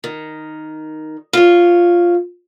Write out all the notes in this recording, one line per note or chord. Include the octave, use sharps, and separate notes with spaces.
D#3
F4 C#5